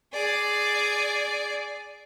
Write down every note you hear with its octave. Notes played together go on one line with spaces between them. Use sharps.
G#4 D5